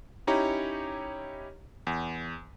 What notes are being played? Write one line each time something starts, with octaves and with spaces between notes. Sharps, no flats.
C#4 D#4 E4 G4 C#5 A#5
E2